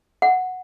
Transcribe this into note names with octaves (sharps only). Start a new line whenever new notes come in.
F#5